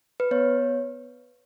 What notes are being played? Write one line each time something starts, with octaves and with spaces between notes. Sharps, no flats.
B4
B3 C#5